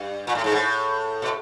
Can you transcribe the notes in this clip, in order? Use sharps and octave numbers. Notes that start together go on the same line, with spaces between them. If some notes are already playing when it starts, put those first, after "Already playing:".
Already playing: G2
A#2
A2
G#2
A2
B2